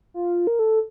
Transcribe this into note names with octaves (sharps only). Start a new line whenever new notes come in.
F4
A#4
A4